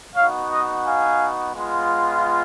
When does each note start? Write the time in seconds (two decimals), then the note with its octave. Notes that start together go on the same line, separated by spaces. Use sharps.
0.15 B3 D#4 F#4 C#5 F5
0.50 D#5 F#5
0.84 F5 G#5
1.55 G#3 B3 F4